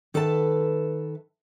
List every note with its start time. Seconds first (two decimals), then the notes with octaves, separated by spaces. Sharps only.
0.14 D#3 A4 B4 E5 A5